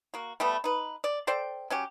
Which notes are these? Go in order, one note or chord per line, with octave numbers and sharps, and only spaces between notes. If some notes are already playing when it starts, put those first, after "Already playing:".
A#3 F#4
G3 A3 B3
D#4 B4
D5
A4 C5 D5 G5
F#3 C#4 G4